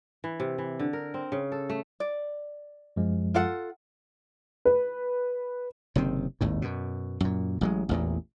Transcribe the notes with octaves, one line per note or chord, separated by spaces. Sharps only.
E3
C3
E3
D3
A#4
C4
C#3
A4
A3
D5
F#2 F3 G#3
F4 A4 F#5
B4
F#1 C3 D#3 C4
G#1 D#2 A2
F#2 B2
F#2 A#2
A1 F#3 G#3
A1 E2 A#2